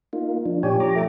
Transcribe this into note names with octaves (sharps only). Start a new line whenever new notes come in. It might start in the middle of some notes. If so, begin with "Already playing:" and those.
A#3 D#4 F4
F3 D4
A#2 G4 C#5 G#5
F3 A#5 D6
A3